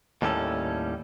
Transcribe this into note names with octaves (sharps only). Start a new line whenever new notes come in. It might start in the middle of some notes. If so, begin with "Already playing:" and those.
D#2 A2 G3 C#4 A4